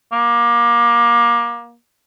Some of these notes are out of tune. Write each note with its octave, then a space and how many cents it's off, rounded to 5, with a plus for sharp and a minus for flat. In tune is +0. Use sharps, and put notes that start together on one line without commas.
A#3 +25